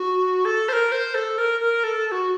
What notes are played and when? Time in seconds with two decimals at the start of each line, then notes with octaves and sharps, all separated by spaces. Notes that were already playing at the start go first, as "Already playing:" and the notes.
Already playing: F#4
0.45 A4
0.68 C5
0.73 A#4
0.92 C5
1.14 A4
1.38 A#4
1.61 A#4
1.84 A4
2.07 A4
2.12 F#4